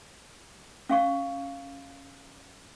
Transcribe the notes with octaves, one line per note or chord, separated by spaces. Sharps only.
C#4 F5 C#6